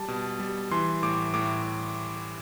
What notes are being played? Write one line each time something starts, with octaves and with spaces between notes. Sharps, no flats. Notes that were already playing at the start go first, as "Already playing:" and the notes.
Already playing: G3 A5
B2
G3
E3 C6
A2 D6
A2 D6